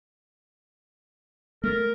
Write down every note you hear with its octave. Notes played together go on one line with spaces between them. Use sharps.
A3 A#4